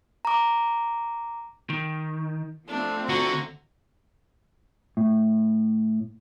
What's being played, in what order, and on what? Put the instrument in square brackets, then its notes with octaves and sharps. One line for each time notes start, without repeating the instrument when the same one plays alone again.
[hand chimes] A#5 D6
[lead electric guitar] D#3
[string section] F3 A3 C4 [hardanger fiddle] D4
[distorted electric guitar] D3 [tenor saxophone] F#4 [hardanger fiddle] A#5
[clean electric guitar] A2